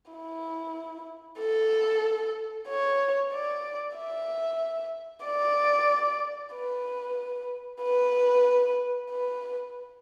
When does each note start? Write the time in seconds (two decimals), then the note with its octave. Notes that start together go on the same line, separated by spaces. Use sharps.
0.12 E4
1.40 A4
2.68 C#5
3.32 D5
3.96 E5
5.25 D5
6.54 B4
7.82 B4
9.11 B4